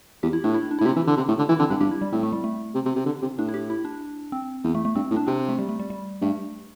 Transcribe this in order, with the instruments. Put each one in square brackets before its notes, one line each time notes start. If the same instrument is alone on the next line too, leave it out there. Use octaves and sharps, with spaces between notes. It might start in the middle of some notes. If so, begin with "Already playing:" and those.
[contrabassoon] E2 [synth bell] G4
[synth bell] E4
[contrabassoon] A2 [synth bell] D4
[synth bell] E4
D4
[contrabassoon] A2 [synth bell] E4
[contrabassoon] C3 [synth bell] G4
[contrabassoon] E3
D3
C3
A2
D3
[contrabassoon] E3 [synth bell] E4
[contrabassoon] D3 [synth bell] C4
[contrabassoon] G2 [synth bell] D4
[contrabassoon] G2 [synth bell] G4
[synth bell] E4
G3
[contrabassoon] A2 [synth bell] C4
[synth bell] A3
G3
A3
[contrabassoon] C3
C3
C3
D3
C3
[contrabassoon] A2 [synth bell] D4
[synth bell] E4
G4
E4
D4
C4
[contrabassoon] E2
[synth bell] A3
A3
[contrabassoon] G2 [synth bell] C4
[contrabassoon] A2
[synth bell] D4
[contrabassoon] C3 [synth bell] C4
[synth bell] A3
G3
A3
G3
G3
[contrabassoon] G2 [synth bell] A3